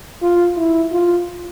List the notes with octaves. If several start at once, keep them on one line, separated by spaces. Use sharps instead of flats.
F4
E4
F4